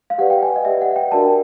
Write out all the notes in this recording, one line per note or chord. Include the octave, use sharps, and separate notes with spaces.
F5
G4 B4 D5 F#5
G5
G#5
D#5
G4 B4 D5 E5
F#5
G5
D4 F#4 A#4 D5 A5